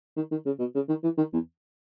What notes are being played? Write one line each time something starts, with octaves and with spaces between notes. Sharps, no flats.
D#3
D#3
C#3
B2
C#3
D#3
E3
D#3
E2